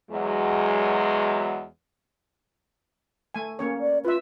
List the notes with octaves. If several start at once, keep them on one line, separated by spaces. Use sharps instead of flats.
E2 F#3 G#3
A3 G#5
A#3 C#4 C#5
D5
F4 B4 E5